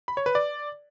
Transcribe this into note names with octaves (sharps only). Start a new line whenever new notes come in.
B5
C#5
B4
D5